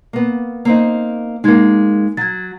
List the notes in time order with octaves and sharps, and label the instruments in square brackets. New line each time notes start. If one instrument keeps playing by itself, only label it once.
[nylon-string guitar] A#3 B3
A#3 C4 D#4
[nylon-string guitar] G#3 A#3 [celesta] D#4 G#6
[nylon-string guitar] F#3 [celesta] G#6 A6